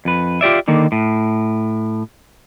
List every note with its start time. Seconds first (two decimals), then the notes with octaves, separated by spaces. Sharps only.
0.05 F2 B4
0.41 F4 G4 D5 E5
0.68 D3 D#3 A#3
0.92 A2